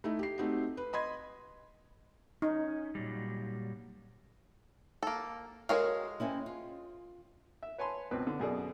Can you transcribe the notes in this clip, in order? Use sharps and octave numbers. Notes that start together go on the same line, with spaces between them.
A3 D#4 E4
G4 C7
A3 C4 D#4 F#4 G4
B4
D#5 B5 C6 G#6
C#4 D#4
A#2 F#3 G3
A#3 A4
G#3 F#4 A4 A#4 C#5 F5
C4 C#4 E4
F4
E5
B4 C#5 G#5 A5 B5 C6
C#2 B2 C4 B4 C5
D3
F#2 B2 G#4 A4 D5